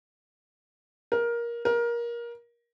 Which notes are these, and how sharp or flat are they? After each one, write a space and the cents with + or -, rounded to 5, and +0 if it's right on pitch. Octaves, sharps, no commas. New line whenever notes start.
A#4 +15
A#4 +20